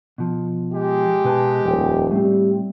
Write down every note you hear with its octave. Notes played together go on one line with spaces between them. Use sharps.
B2 F3
G#3 G4
B2 B4 A5
D#1 F2 G5
A2 G3 C4